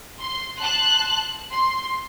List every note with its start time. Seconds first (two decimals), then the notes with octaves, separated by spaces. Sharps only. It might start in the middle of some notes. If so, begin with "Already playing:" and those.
0.21 C6
0.61 A5 C6 F#6
1.51 C6